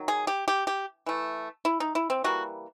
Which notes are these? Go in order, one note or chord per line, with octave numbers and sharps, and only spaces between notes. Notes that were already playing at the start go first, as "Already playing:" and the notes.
Already playing: D#3 F#3
G#4
G4
G4
G4
E3 A3
E4
D#4
E4
C4
E3 G3 A#3 F#4